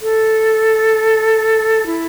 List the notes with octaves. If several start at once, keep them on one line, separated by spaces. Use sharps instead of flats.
A4
E4